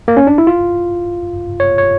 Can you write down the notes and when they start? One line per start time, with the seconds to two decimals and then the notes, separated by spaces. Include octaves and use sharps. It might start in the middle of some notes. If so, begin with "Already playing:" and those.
0.08 A#3
0.17 C#4
0.27 D4
0.38 E4
0.47 F4
1.60 C#5
1.78 C#5